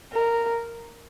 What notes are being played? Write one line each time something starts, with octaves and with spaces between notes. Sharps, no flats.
A#4